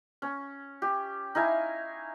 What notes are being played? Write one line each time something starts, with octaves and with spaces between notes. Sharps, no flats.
C#4
G4
D#4 E4 F5 G#5